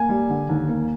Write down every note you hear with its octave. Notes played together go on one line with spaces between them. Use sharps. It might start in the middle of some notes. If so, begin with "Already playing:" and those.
Already playing: A#3 G#5
G3
D3
D#2
A#3